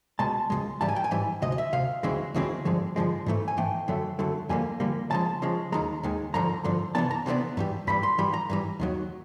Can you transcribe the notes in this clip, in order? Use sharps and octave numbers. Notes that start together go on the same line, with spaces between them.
C#2 B2 G#3 A5
C#2 B2 G#3
G#2 E3 G3 A5
G#5
G5
G#5
G#2 E3 G3
D2 C3 D#5
D#5
E5
D2 C3 F5
D2 C#3 E3 G#3 C4
D2 C#3 E3 G#3 C4
G2 D3 F3 G#3
G2 D3 F3 G#3
G#2 E3 A3
G#5
G#2 E3 A3 G5
F#2 D3 F#3 A3
F#2 D3 F#3 A3
F2 D3 G3 A#3 G#5
F2 D3 G3 A#3
C#3 F3 G#3 A5
C#3 F3 G#3
D#2 D#3 G#3 A#5
D#2 D#3 G#3
G2 D3 F3 A#5
G2 D3 F3
C3 E3 G#3 B3 D4 A5
A#5
C3 E3 G#3 B3 D4
G2 E3 G3
G2 E3 G3 B5
C6
G2 E3 G3 B5
A#5
G2 E3 G3
D#2 D#3 F#3